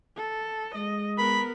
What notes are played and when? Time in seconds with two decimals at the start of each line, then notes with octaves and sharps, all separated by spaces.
0.17 A4
0.75 G#3 D#5
1.18 B3 A#4 B5